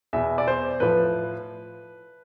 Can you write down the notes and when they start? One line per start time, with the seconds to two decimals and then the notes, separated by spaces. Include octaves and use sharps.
0.13 E2 B2 E5
0.38 D5
0.48 C5
0.80 A2 F3 B4